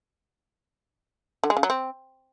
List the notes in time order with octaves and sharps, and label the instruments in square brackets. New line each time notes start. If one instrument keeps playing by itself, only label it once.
[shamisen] D3
G#3
C#3
F#3
C4